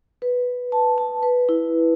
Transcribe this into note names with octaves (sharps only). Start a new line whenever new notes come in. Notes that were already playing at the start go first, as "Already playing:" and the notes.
B4
A5
A5
B4
E4